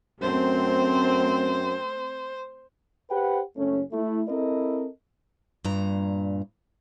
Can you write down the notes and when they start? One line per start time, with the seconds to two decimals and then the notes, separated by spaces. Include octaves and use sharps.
0.21 F#2 A3 C4 C5
3.11 G4 B4 C5 F#5 G5
3.57 F#1 A3 C#4
3.92 A3 E4
4.29 C4 E4 A4 A#4 D#5
5.65 G2 A#2 A#5